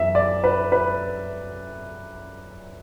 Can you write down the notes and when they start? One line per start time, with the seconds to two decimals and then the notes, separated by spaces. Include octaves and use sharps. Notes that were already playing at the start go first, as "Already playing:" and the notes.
Already playing: F#2 E3 B3 E5
0.15 D5
0.44 B4
0.72 B4